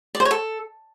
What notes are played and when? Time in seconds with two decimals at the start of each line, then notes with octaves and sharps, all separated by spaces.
0.15 D5
0.20 C5
0.25 C#5
0.31 A4